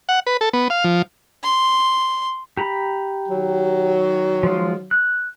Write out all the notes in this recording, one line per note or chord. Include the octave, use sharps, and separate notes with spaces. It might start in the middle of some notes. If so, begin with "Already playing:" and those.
F#5
B4
A4
B3
F5
F3
C6
G4 A#5 B5
D#3 F#3
F3 G#3 F4
F#6